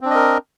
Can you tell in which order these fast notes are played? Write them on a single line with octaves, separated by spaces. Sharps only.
C4 D4 D#5 A#4